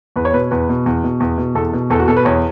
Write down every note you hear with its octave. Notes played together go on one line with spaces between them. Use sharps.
E2 B4
C#5
B2 B4
E2 B4
B2
E2
B2
E2
B2
E2 A4
B2
E2 A4
F#4
B2 A4
B4
E2 C#5